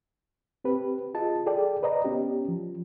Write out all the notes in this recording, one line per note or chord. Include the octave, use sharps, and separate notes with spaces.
C4 G4 B4
F4 G#4 D#5 A5
G#4 A4 D5 G5
B4 D5 D#5 A#5
B3 C#4 G4
F3